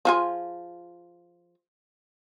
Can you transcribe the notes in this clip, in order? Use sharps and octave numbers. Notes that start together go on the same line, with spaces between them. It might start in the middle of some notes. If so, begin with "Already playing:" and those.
F3 F4 G#4